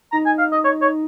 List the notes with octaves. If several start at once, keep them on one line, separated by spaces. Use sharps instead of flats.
D#4 A#5
G#5
F5
D#5
C#5
C#5